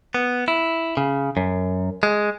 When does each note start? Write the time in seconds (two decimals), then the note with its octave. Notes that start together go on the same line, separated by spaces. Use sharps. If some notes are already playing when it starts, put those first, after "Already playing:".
0.14 B3
0.48 E4
0.97 C#3
1.37 F#2
2.03 G#3